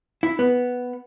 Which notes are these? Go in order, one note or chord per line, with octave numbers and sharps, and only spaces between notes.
E4
B3